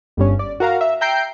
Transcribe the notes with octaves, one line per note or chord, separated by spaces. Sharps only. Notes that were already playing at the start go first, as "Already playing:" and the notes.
G1 G2 C#4
D5
F#4 A#4 F5 A#5
E5
E5 G5 A#5 G6 C7 D7